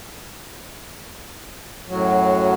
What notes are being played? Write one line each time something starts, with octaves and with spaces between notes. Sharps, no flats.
F#2 A2 F#3